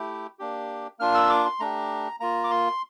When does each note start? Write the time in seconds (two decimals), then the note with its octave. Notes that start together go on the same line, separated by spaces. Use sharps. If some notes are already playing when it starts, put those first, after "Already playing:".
Already playing: A3 E4 G4
0.39 A#3 D4 G4
0.99 A#3 D4 F4 F6
1.15 E6
1.30 D6
1.45 C6
1.60 A3 D4 G4 A#5
2.20 A#3 F4 A#5
2.44 D6
2.51 C6